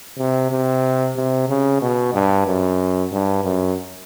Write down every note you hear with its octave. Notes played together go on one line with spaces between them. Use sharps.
C3
C3
C3
C#3
B2
G2
F#2
G2
F#2